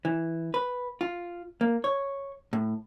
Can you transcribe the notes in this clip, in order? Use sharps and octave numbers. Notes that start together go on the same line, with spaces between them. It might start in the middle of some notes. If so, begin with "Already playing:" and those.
E3
B4
F4
A#3
C#5
A2